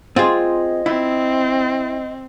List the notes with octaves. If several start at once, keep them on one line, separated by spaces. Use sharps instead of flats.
C4 F4 G#4 D#5
C4 E4